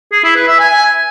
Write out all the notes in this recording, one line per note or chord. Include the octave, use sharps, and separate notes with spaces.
G#4
E4
B4
E5
G#5